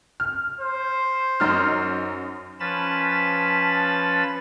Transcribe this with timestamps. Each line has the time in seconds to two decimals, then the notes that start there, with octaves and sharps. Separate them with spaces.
0.20 F6
0.60 C5
1.40 F#2 D#4 F6
2.60 F3 C#4 B4 A5 B5 A6